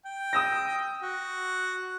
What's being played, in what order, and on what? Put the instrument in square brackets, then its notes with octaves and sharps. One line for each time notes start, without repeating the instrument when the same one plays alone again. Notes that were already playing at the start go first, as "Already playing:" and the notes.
[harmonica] G5
[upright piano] D#6 E6 A#6
[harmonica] F#4